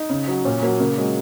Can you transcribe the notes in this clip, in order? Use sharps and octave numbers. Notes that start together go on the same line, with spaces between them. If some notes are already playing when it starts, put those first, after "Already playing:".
Already playing: D#4
C#3
F#3
A#2 C#4
F#3 A#3
C#3 A#3
F#3 G#3